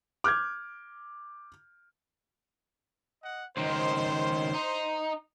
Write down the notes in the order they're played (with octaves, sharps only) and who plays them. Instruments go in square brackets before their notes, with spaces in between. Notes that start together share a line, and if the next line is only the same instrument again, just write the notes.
[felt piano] D6 F6 G6 G#6
[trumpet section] D#5 F#5
[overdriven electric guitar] C#2 D#3 [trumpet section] C5
[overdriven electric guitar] D#4